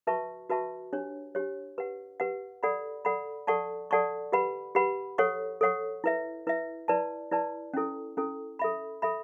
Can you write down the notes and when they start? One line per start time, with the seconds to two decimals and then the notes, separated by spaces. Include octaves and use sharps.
0.07 F#4 B4 E5 A5 C#6
0.49 F#4 B4 E5 A5 C#6
0.93 D4 G4 C#5
1.35 D4 G4 C#5
1.78 G4 B4 F#5
2.20 G4 B4 F#5
2.63 A4 D5 F#5 B5
3.05 A4 D5 F#5 B5
3.47 A4 D5 F#5 A5 C#6
3.91 A4 D5 F#5 A5 C#6
4.32 G4 B4 F#5 B5
4.75 G4 B4 F#5 B5
5.18 A4 C#5 F#5 C#6
5.61 A4 C#5 F#5 C#6
6.04 E4 B4 E5
6.47 E4 B4 E5
6.88 E4 B4 D5 A5
7.31 E4 B4 D5 A5
7.74 C#4 E4 A4
8.17 C#4 E4 A4
8.59 A4 E5 B5
9.02 A4 E5 B5